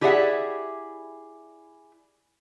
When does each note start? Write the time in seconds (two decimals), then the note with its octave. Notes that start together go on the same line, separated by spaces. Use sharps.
0.01 E4 G4 G#4 D5 E5 F#5